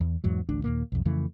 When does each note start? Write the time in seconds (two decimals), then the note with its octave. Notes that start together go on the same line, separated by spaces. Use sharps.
0.01 E2
0.24 E2 G#2 F#3
0.49 A1 D2 D4
0.64 D#2 A#2 A#3
0.92 B1 F2
1.05 F2 C#3 E3 A3